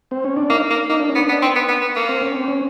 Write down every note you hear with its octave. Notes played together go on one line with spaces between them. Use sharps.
C4
C#4
D4
A#3 D#4
A#3
A#3 D#4
D4
C#4
B3
D4
B3
C4
B3
B3
B3
A#3
C4
C#4
C4
C#4